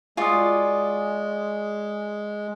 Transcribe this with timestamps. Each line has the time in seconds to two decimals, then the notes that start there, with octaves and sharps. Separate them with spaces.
0.17 G#3 F4 F#4 D5 G#5 D#6